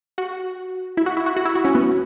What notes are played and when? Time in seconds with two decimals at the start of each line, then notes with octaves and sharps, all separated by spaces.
0.18 F#4
0.97 E4
1.06 F#4
1.17 E4
1.26 F#4
1.36 F#4
1.45 E4
1.55 F#4
1.65 C#4
1.75 B3